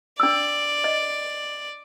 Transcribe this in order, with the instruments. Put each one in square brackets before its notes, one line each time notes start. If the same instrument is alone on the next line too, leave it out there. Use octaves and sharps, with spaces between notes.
[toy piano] D4 E6 [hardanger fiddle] D5
[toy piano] D#5